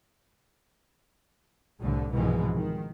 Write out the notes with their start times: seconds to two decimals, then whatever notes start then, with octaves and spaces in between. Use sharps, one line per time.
1.81 C2 A2 D3
2.12 C2 G#2 B2 E3 F3 G#3
2.56 D#3